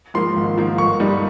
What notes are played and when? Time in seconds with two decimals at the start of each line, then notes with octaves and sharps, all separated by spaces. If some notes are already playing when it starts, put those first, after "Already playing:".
0.14 G#2 F3 A#3 C6
0.36 G#1
0.57 G#2 F3 A#3
0.78 G1 C#6
1.00 G2 G3 A#3 D#4